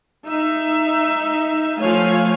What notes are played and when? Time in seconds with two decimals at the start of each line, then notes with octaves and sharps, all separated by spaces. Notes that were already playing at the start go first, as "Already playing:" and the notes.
0.24 D#4 E5
1.78 F3 A3 C#5 F5 G#5